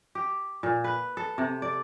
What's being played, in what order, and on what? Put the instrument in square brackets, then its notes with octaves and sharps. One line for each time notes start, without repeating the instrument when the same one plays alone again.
[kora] G4
A#2
B4
A4
C3
D5